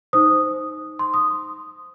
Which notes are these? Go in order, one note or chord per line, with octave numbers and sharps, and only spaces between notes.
D#4 C5 D#6
C6
D#6